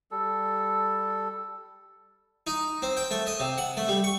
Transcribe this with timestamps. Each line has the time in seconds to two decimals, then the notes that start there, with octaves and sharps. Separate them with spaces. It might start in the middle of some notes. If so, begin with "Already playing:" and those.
0.11 G3 A4
2.47 D#4
2.82 C4
2.97 G5
3.11 A3
3.27 D#5
3.40 C3
3.58 F#5
3.77 A3
3.88 G3
4.04 C#6